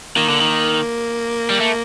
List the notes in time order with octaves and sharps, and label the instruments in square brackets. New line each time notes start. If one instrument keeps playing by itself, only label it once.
[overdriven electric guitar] D#3 [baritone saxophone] A#3
[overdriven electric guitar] D3
D#3
G3
A3